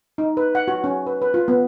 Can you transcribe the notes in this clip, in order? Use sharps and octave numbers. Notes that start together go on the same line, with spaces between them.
D#4
B4
F#5
F#4
C#4
B4
B4
F4
B3